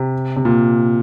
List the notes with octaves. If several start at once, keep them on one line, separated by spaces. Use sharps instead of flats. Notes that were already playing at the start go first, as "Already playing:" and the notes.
Already playing: C3
C3
A#2